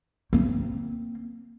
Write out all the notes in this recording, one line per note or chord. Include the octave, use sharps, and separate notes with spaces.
A#3 C4